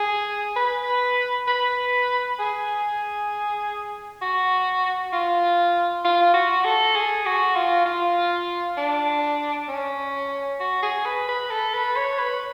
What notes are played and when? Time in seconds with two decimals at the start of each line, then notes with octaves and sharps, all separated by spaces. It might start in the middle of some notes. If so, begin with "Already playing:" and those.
Already playing: G#4
0.56 B4
1.48 B4
2.39 G#4
4.21 F#4
5.13 F4
6.05 F4
6.34 F#4
6.65 A4
6.95 G#4
7.26 F#4
7.56 F4
7.86 F4
8.77 D4
9.69 C#4
10.60 F#4
10.82 G#4
11.05 B4
11.28 B4
11.50 A4
11.74 B4
11.96 C#5
12.19 B4